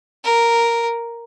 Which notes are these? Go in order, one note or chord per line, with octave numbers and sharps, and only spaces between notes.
A#4